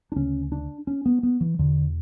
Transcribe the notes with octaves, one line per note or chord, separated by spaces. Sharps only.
D4
D2 C#3 C#4
D4
C#4
B3
B3
E3
E2 B2 D3